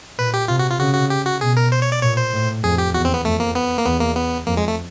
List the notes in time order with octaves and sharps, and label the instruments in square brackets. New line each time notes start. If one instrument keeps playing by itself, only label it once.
[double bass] A#2 [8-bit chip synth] B4
[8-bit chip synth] G4
[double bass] C3 [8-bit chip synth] F4
[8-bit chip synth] F#4
F4
[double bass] C#3 [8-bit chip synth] F#4
[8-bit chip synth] F#4
G4
F#4
[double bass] B2 [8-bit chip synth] G#4
[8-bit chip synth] A#4
C5
C#5
D5
[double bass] A#2 [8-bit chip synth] C#5
[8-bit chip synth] C5
[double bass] A2
[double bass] F2 [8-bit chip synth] G#4
[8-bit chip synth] G4
[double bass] E2 [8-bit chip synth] F#4
[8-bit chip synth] C4
B3
[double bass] F2 [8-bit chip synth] A3
[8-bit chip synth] A#3
B3
A#3
[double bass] E2 [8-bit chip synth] B3
[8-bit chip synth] A#3
B3
[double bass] F2 [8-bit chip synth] A#3
[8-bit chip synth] G#3
A3